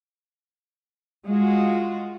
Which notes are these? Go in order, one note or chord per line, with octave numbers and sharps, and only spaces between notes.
G#3 F4 F#4